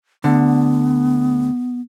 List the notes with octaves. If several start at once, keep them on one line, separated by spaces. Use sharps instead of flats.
D2 D3 B3